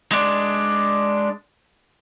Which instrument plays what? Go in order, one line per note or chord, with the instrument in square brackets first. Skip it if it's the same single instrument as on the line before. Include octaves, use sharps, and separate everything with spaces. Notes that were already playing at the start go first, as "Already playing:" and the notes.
[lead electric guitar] G#3 D4